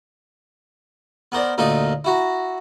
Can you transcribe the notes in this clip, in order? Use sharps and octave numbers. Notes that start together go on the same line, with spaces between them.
B3 A#4 C5 D5
D2 A#2 A#3 D#4 A4 D#5
E4 F#4 A#5